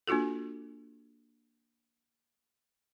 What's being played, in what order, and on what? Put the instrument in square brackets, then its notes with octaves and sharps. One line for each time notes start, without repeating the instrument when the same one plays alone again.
[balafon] A#3 D4 F4 F#4 A4